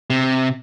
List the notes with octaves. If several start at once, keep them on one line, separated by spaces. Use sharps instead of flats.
C3